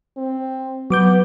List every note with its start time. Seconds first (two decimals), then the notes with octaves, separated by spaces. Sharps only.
0.17 C4
0.90 F#3 B3 D6 G6